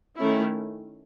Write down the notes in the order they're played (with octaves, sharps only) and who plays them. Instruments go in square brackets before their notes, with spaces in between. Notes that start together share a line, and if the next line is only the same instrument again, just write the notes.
[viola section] D#3 A3 C#4 E4